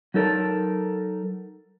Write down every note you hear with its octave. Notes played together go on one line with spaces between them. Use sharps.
F#3 D#4 A4 A#4